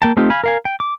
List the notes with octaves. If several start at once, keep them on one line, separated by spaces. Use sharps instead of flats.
A#3 G5 A5
A3 C4 D#4 F4 G4
F5 G#5 B5
A#4 F5 G#5
G5
D6